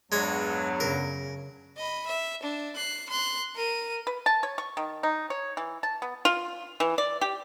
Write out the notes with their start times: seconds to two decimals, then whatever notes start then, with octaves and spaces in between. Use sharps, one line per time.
0.12 E2 G2 F#3 G#3 C#5
0.80 F#2 C#3 A#4
1.77 D#5 B5
2.07 E5
2.43 D4
2.76 F#6 C7
3.09 C6 F#6
3.55 A#4 D#7
4.07 B4
4.26 A5
4.43 C#5
4.58 C#6
4.77 D#3
5.03 D#4
5.30 C#5
5.57 E3
5.83 A5
6.02 B3
6.25 F4
6.80 E3
6.98 D5
7.21 G4